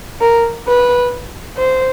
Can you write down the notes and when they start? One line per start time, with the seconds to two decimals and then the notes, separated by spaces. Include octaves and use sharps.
0.21 A#4
0.67 B4
1.58 C5